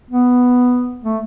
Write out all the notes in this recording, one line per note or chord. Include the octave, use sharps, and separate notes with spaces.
B3
A3